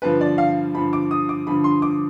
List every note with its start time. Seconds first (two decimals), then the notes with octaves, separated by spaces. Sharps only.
0.02 G2 D3 F3 B4
0.21 D5
0.38 F5
0.74 G2 D3 F3 B5
0.93 D6
1.11 D#6
1.29 D6
1.47 G2 D3 F3 B5
1.64 C6
1.82 D6